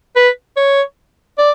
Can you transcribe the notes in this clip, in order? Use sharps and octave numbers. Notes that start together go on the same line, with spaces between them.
B4
C#5
D5